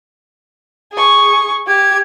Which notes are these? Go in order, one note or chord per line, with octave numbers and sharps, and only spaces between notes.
G#4 C#6
G4 G#6